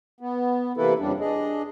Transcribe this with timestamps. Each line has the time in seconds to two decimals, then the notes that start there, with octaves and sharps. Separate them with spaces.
0.21 B3
0.77 C3 E3 A#3 E4 A4 B4
0.99 F2 C#3 G3 D4
1.20 D4 G#4 D#5